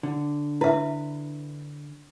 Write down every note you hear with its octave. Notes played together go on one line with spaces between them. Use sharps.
D3
E4 B4 E5